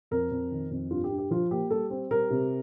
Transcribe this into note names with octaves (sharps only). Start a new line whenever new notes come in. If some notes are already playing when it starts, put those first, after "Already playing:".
F2 A#4
F2
D#3
F2
G2 F4
G4
G2
G4
F3 F4
A#3 G4
G3 A4
C4
G3 A#4
C3